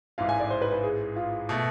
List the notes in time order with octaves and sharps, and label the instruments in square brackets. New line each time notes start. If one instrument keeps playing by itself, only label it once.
[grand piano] A1 G#2 E3 [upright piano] F5
[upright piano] G#5
D5
C5
B4
B4
G#4
F4
[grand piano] B2 A3